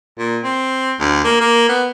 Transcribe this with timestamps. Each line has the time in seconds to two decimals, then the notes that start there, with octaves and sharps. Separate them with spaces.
0.18 A#2
0.44 C4
1.00 D2
1.24 A#3
1.41 A#3
1.69 B3